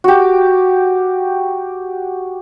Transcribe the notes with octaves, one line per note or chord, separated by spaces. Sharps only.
F#4 G4